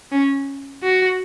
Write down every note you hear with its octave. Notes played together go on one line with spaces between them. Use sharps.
C#4
F#4